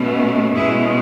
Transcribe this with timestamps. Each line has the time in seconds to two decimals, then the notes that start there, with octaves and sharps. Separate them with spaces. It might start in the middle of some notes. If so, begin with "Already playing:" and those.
Already playing: B2 A3 C#4
0.54 B2 G#3 C#4 E4 G#4